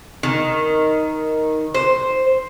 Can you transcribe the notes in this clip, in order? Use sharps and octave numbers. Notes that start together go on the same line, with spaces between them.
D#3
C5